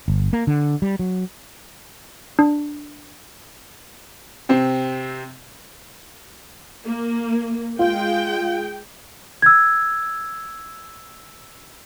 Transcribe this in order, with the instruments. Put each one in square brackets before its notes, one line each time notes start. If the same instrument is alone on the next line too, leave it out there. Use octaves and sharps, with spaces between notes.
[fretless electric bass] G1
A#3
D3
G3
F#3
[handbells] D4
[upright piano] C3 C4
[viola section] A#3
[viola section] G#3 G5 [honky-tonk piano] F4
[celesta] E6 G#6